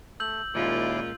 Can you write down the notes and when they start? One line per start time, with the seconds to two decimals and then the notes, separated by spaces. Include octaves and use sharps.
0.20 A3 E6 G6 F#7
0.55 D#2 A#2 G#3 C#4 E4 F4 D5